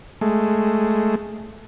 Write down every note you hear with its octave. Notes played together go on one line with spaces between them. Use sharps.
G#3 A3